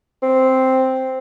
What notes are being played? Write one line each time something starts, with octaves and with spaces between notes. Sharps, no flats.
C4